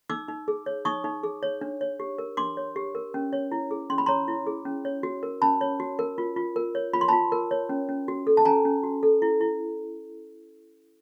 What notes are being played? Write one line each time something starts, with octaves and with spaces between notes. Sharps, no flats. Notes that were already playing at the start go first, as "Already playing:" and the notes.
D#4 D6 E6
D#4
G#4
C#5
D#4 C#6 D#6
D#4
G#4
C#5
D4
C#5
G4
A#4
D4 C6 D6
C#5
G4
A#4
C#4
C#5
E4
G#4
C#4 C6
B5
C#5 A#5 C6
E4
G#4
C#4
C#5
F#4
A#4
C#4 A5 B5
C#5
F#4
A#4
F4
F4
A#4
C#5
F4 B5
C6
F4 A5 B5
A#4
C#5
C#4
C#4
F#4
A4
A5
C#4 G#5 A#5
C#4
F#4
A4
E4
E4